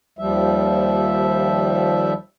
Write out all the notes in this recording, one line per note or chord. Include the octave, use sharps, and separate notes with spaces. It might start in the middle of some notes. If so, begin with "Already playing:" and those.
D#2 F3 G3 E5